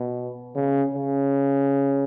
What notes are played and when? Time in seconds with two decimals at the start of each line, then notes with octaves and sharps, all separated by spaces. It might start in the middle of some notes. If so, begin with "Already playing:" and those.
Already playing: B2
0.55 C#3
0.94 C#3